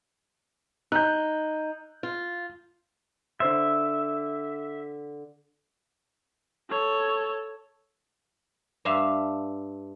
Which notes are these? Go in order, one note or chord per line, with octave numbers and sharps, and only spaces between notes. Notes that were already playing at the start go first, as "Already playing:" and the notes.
D#4 F#6 G6
F4
D3 C5 E5 C6
A4 C#5
G2 D4 E5 F5